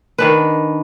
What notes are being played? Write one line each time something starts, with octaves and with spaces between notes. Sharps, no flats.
D#3 D4 B4